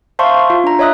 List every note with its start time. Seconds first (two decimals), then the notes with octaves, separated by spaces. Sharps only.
0.19 C5 E5 F5 A5 C6 C#6
0.50 F4
0.64 D4 A#5
0.79 C#5 D#5 E5 D#6 F#6